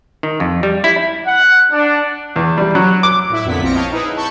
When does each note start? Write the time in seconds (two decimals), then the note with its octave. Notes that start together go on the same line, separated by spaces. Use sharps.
0.23 D#3
0.40 F2
0.63 G3
0.84 E4
1.26 F#5
1.72 D4
2.36 E2
2.58 G3
2.75 F#3
3.03 D6
3.30 A2 E4
3.45 F2 A#2 D3 B3 E4 B6
3.62 A#1 C4 F4 A#6 C#7 D7
3.74 C#5 D#5 F5 G5 A5
3.92 D#4 E4 G#4 B4
4.17 A5 B5 C#6 G6